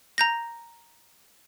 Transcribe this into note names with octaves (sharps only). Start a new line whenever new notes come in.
A#5 G6 A#6